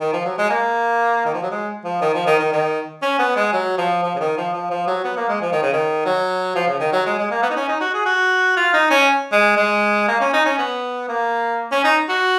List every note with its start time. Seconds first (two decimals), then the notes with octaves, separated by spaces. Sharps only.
0.01 D#3
0.13 F3
0.25 F#3
0.38 G#3
0.50 A#3
1.25 D#3
1.34 F3
1.42 F#3
1.51 G#3
1.84 F3
2.01 D#3
2.14 F3
2.26 D#3
2.39 D#3
2.52 D#3
3.02 C#4
3.19 B3
3.36 G#3
3.52 F#3
3.78 F3
4.03 F3
4.15 C#3
4.19 D#3
4.37 F3
4.53 F3
4.70 F3
4.87 F#3
5.04 B3
5.17 A#3
5.28 G#3
5.41 F3
5.52 D#3
5.62 C#3
5.72 D#3
6.05 F#3
6.55 F3
6.68 C#3
6.80 D#3
6.92 F#3
7.06 G#3
7.18 G#3
7.30 A#3
7.42 B3
7.50 D#4
7.56 C#4
7.68 D#4
7.80 F#4
7.94 G#4
8.06 F#4
8.56 F4
8.73 D#4
8.90 C#4
9.32 G#3
9.57 G#3
10.08 A#3
10.20 C#4
10.33 D#4
10.45 C#4
10.58 B3
11.08 A#3
11.72 C#4
11.84 D#4
12.09 F#4